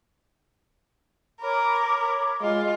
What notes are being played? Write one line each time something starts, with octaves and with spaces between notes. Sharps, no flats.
A#4 C#5 B5 D6
G#3 F4